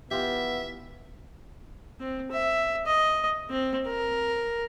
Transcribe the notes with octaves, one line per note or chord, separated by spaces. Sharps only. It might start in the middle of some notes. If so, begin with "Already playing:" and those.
E3 B3 F4 G4 E5
C4
E5
D#5
C4
A#4